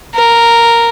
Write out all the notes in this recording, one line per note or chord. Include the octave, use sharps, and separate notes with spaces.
A#4